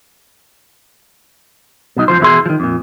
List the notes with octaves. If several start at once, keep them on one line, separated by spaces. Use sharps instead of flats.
B2 F#3 D#4
F2 E3 F3 C5
E2 B2 E4 G#4 C6
D#3 F3
F2 A#2